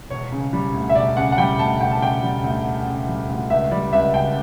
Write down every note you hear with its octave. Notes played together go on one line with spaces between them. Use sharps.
E1 C#5
C#3
G3
D2
E5
E1 D5
C#3 F#5
F#5
G3 G5
D2 A5
E1 G5
A5
C#3 G5
G3
D2
E1
C#3
G3
D2
C#2 E5
G3 D5
C#2 E5
C#3 G5